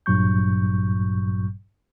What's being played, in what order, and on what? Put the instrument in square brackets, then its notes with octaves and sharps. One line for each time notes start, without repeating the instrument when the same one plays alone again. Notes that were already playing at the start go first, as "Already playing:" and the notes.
[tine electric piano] A1 G2 A#2 F#3 C#6 G6